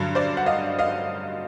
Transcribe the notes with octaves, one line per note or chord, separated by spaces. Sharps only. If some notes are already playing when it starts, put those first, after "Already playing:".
Already playing: G2 D3 F#3
C5 D5
F#5
D#5 F5
D#5 F5